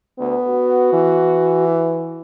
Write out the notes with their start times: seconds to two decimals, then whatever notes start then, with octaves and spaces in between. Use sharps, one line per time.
0.19 D2 B3
0.48 F#4
0.93 E3
1.68 E4